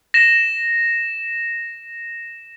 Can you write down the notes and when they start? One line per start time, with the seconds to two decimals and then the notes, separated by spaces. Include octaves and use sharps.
0.14 A#6 E7